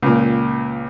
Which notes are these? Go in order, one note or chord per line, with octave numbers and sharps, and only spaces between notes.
C#2 A#2